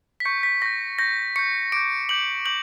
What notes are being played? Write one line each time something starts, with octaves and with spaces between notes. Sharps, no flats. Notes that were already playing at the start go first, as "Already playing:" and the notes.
B6
C#6 G6 C#7
B6
C#6 G6 A#6
C#6 G6 A#6
C#6 G6 C#7
D6 G6 D7
D6 G6 F#7
D6 G6 F#7